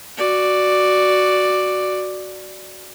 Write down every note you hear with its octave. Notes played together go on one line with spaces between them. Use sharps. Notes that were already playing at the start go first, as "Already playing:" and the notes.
F#4 D5